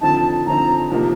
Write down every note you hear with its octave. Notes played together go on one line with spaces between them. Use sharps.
D3 F3 C4 D#4 A5
D3 F3 C4 D#4 A#5
C3 F3 A#3 D#4